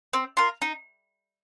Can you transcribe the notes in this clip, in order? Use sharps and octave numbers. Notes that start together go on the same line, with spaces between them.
C4
F4 A#4
D#4